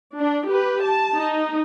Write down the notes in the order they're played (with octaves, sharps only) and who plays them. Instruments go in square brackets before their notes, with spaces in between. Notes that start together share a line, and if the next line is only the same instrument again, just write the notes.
[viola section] D4
G4 B4
A5
D#4